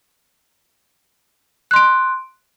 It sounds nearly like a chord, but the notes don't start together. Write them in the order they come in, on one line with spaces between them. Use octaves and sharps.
F#6 C6 D7